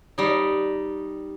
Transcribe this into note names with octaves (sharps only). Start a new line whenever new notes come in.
G3 D#4